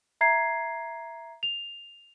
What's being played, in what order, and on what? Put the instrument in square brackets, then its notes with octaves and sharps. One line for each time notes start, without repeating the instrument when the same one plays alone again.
[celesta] E5 A#5 G#6 C7
F7